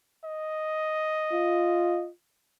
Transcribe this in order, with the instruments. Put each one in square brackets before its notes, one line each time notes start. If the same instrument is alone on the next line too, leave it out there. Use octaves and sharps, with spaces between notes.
[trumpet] D#5
[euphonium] F4